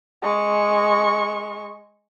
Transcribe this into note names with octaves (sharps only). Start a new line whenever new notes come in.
G#3 C#6